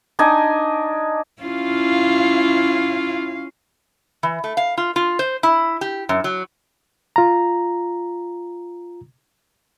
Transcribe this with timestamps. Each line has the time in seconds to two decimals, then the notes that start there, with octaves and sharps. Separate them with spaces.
0.19 D4 D#4 D#5 G#5
1.43 C#4 E4 F4 F5
4.23 E3
4.44 A3
4.57 F5
4.77 F4
4.96 F4
5.19 C5
5.43 E4
5.81 G4
6.09 F#2
6.24 F#3
7.16 F4 A#5